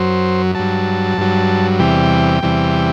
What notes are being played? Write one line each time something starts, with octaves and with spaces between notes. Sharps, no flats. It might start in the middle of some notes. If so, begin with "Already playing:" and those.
Already playing: F#2 F#3 C5
G2 F#3 A5
G2 F#3
E2 C3 E3 G3 G5
E2 C3 E3 G3